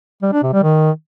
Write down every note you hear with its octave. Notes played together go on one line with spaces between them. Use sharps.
G3
D4
C3
G3
D#3